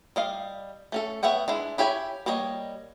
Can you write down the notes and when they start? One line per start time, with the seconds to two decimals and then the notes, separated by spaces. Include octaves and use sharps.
0.16 G3 D#5 F5
0.92 A3 C#4 A4
1.23 B3 C#5 E5 F#5 G5
1.48 G#3 D4 E4
1.78 E4 G4 C#5 G#5 B5
2.26 G3 A#3 C#5 D#5